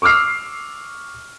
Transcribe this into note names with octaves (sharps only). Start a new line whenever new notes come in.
C#6 D6 E6 F6 C7